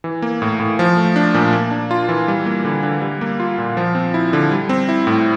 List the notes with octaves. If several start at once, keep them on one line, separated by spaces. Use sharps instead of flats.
E3
A#3
A2
A2
F3
A3
D4
A#2
A#3
D4
F4
E3
G3
A#3
D3
D3
G3
A#3
F4
A#2
F3
C4
E4
D3
G3
C4
E4
A2